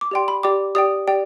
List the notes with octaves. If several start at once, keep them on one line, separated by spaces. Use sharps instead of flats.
D6
G4 D5 G5 C6
B5
G4 D5 G5 D6
G4 D5 G5 D#6
G4 D5 G5